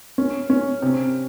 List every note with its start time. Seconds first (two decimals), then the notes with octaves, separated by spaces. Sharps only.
0.18 C#4
0.50 C#4
0.82 C3